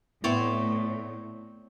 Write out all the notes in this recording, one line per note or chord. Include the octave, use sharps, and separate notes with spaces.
A2 B3 C4 E4 C#5 D5